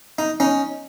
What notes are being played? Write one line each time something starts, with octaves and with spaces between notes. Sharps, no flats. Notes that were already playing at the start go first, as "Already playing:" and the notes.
D#4
C#4 D#4